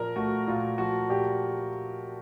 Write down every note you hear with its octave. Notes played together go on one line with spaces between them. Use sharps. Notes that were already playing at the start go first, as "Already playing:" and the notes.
Already playing: A#2 F3 A#4
A3 F#4
A#2 F4
F3 F#4
A#2 G4